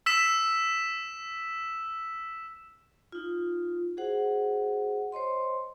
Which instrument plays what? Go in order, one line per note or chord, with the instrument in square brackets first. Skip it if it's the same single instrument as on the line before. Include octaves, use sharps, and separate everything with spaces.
[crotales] E6 B6 E7
[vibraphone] D#4 F4
F#4 G#4 C5 F#5
C5 C#5 D#5 C6